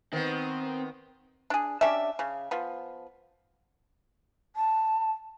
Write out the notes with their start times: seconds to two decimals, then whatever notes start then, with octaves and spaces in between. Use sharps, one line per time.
0.13 D#3 B3 C4
1.50 D4 G#4
1.81 C#4 D4 G4 E5
2.19 C#3
2.51 F3 B3
4.56 A5